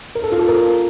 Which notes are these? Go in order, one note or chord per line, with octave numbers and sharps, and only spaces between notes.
A#4
A4
F4
A4
A#4